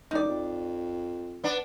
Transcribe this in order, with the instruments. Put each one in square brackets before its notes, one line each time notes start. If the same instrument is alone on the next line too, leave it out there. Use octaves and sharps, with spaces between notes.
[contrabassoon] E1 [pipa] D#4 D5
[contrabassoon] F2
[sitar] B3 D4